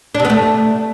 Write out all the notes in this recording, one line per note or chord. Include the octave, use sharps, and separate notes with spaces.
D4
C3
B3
A3